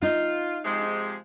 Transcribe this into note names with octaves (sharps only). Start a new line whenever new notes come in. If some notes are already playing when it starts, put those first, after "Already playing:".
D#4 F4
C3 F3 G#3